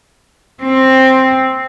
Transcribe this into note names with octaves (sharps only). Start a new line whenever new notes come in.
C4